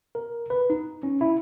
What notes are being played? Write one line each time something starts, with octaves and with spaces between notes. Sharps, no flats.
A#4
B4
D#4
C#4
E4